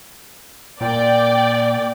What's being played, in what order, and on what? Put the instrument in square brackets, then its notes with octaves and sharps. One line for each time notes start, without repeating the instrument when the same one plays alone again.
[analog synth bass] A#2 [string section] D5 G5